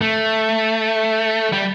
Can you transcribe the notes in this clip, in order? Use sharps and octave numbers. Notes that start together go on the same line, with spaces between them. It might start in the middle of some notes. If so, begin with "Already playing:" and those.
A3
G3